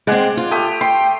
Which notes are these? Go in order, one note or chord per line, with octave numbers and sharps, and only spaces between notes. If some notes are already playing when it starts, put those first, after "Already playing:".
G#3 C4 D5 F#5 G#5
F4
A3 G4 D#6
G5 C6